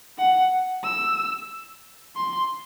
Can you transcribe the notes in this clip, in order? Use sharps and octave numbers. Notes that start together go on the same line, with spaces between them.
F#5
E6
C6